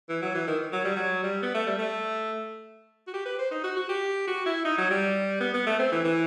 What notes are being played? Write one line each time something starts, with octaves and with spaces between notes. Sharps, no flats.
E3
F#3
E3
D#3
F#3
G3
F#3
G3
B3
A3
G3
A3
F#4
G4
B4
C5
D#4
F#4
F#4
G4
F#4
E4
D#4
F#3
G3
B3
B3
A3
C4
E3
E3